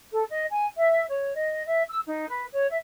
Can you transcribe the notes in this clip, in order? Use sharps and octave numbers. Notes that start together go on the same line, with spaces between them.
A4
D#5
G#5
E5
C#5
D#5
E5
E6
D#4
B4
C#5
E5